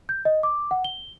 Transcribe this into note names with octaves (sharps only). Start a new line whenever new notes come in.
G6
D#5
D6
F#5
G7